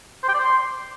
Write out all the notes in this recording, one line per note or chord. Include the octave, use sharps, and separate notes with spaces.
C5
G5
D5
C5
C6